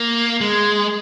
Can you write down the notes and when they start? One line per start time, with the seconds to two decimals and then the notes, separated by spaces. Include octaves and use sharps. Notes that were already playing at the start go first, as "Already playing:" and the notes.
Already playing: A#3
0.41 G#3